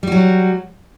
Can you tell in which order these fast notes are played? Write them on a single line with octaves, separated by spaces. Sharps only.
G3 F#4 F#3